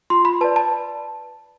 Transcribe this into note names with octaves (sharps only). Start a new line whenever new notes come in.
F4 C6
B5
B4 D5 A5
A5